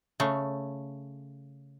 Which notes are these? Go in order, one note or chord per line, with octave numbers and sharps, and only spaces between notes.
C#3 A3